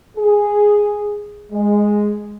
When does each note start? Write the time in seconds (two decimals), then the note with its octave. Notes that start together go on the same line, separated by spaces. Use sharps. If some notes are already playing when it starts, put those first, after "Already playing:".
0.17 G#4
1.52 G#3